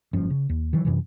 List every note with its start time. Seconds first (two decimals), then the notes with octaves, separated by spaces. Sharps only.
0.13 F#1 G2 F3 C#4
0.30 C#3
0.49 D#2
0.73 D#3 E3 F#3
0.85 F#2 C3 E3